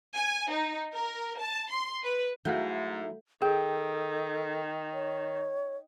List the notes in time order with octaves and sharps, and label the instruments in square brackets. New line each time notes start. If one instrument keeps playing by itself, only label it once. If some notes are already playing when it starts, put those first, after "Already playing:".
[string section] G#5
D#4
A#4
A5
C6
B4
[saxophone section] G#2 [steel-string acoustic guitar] F#3 D#4 E4 [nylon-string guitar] A3 [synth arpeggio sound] F5 F#5 G6
[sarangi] D#3 [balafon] G#4 [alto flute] A4 [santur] G5
[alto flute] C#5